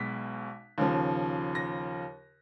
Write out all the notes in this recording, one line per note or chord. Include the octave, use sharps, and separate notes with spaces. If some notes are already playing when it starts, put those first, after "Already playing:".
Already playing: B1 B2 G#3 B6
D#2 C#3 F3
A#6